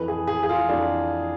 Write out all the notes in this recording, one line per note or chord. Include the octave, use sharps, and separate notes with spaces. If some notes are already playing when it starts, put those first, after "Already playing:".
Already playing: F2 E3 B4
G#4
G#4
G#4
F4
F2 E3 D4